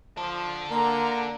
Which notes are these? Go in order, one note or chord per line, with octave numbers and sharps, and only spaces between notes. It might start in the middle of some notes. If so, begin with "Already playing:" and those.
F3 D4 A4
D3 A#3 A#5